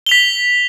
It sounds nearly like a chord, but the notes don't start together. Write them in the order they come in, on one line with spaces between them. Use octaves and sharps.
G7 F7 B6